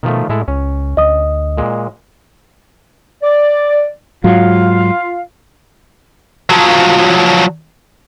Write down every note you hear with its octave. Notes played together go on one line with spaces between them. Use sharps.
B2 D#3 F3 A3
A2 G#3 E4 A4
C#2 C#4
D2 D#5 D#6
A#2 G#3
D5
G#2 F#3 F4 F5
F3 F#3